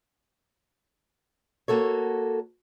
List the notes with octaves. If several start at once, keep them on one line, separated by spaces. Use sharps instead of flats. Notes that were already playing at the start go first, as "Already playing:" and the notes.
A#3 F#4 A4 C#5